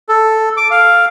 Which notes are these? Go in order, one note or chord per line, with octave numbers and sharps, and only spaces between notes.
A4
D6
F5